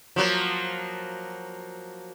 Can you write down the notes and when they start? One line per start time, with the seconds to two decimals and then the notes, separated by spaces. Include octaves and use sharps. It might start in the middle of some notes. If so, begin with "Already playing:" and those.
0.16 F3 F#3 A#3